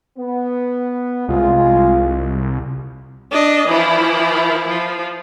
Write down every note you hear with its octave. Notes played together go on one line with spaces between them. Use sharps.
B3
C2 G#3 F4
D4 D#5
E3 F3 E4
F3